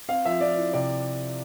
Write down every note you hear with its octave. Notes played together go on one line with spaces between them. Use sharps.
C4 F5
F3 E5
F3 D5
E4
C3 D5